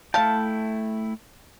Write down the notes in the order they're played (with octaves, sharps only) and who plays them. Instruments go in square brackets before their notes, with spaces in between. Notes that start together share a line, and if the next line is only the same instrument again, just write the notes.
[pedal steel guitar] A3 E4 G5 [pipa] F5 A5